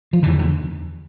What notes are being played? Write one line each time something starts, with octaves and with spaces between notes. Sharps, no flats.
F3
E2 D3 E3
D3